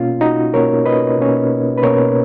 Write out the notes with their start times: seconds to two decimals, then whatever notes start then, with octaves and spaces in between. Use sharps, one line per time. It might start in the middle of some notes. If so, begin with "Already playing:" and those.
Already playing: B2 A#3 C#4 F4
0.21 D#4 F#4
0.54 B2 A#3 C#4 A#4 C#5
0.86 B4 D#5
1.18 B2 A#3 C#4
1.77 B4
1.83 B2 A#3 C#4 A#4 C#5